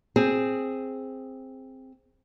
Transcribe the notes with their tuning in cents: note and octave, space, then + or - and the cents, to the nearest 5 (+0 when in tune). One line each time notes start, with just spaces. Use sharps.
C4 +5 G#4 +0